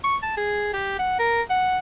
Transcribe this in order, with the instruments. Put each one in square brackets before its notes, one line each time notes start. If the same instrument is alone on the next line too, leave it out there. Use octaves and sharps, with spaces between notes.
[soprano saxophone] C#6
A5
G#4
G4
F#5
A#4
F#5